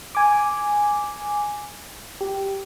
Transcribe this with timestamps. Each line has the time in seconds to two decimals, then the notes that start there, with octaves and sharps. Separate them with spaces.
0.15 G#5 D6
2.21 G4